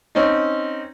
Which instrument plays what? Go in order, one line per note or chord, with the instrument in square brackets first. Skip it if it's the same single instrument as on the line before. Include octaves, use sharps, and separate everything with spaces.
[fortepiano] C4 C#4 D#4